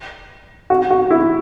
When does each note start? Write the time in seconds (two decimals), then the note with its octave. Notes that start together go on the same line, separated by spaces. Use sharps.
0.70 F#4
0.90 F#4
1.11 E4